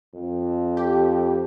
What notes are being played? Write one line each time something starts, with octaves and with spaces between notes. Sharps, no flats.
F2
G4